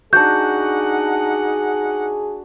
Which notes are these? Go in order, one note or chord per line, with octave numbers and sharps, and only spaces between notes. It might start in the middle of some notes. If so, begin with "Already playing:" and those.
D4 D#4 F#4 G#4 F#5 G6